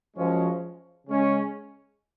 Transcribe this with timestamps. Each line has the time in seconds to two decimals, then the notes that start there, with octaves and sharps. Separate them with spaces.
0.15 F#2 F3 G#3 C#4
1.06 C#3 G#3 C#4